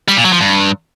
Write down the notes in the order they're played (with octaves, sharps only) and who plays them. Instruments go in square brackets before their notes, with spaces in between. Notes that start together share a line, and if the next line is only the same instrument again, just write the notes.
[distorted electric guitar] G3
A#2
F#3
F3
G2